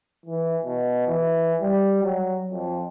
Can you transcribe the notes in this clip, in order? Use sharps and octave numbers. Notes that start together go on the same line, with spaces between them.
E3
B2
E3
G3
F#3
F2